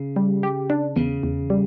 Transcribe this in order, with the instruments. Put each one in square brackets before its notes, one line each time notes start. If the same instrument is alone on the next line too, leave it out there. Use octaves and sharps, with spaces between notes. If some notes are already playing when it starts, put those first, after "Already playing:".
Already playing: [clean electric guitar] C#3
[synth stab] G3
G4
D4
[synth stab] E2 [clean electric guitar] C#3
[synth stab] E2
G3